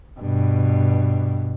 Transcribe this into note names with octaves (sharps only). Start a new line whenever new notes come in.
G2 B2